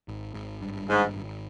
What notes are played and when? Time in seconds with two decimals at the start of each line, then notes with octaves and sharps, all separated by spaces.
0.08 G#1
0.34 G#1
0.62 G2
0.89 G#1 G#2
1.15 G#1